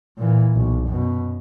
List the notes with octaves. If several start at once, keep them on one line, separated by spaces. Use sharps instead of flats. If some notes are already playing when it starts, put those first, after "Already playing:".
A#2 E3
B1
F#2 B2